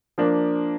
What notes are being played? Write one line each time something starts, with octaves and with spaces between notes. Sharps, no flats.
F3 A#3 D4